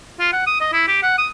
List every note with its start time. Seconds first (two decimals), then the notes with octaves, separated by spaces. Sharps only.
0.20 F4
0.33 F#5
0.47 D#6
0.61 D#5
0.73 E4
0.88 G4
1.03 F#5
1.18 D#6